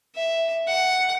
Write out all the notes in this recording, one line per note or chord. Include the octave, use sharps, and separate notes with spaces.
E5
F#5